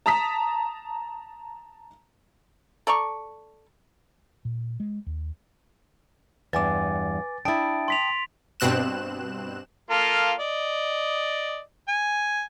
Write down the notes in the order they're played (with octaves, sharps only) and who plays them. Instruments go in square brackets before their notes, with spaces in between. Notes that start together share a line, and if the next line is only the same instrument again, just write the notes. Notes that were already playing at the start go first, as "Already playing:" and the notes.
[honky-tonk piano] A5 A#5 D#6 B6
[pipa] A4 D5 A#5 C#6
[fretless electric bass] A#2
G#3
D#2
[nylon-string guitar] E2 G2 [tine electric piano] B4 G#5 D6 [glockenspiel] A6
[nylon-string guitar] D4 E4 [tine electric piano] G5 A5 D#6 [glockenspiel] A6 D7
[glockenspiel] C6 B6 F7
[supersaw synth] G2 B2 C4 F#6 E7
[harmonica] A#3 F4 A4
D5 D#5
G#5